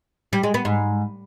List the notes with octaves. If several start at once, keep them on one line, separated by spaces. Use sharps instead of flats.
G3
G#3
B3
G#2